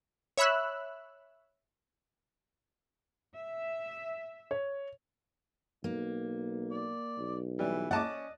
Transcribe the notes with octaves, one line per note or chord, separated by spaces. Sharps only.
C#5 E5 B5 E6 F#6
E5
C#5
B1 A#3
D5
B1
E3 G3
C#4 D5 D#5 F#5 A5 D6